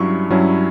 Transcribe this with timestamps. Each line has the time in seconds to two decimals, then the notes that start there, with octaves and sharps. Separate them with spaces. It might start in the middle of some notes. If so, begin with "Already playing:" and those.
Already playing: G2 F#3 C#4 E4 C#6
0.30 G2 F#3 C#4 E4